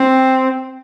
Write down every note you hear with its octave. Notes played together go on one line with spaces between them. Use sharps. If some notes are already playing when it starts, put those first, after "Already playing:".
Already playing: C4